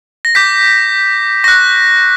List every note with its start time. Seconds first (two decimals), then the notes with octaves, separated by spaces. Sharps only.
0.25 A#6
0.35 D6 G6 B6
1.44 C#6 F#6 A#6